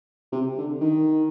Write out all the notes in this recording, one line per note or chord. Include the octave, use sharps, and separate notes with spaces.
C3
D3
D#3